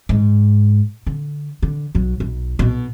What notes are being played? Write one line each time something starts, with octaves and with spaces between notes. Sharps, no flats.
G#2
D3
D3
B1 F#3
B1
B1 B2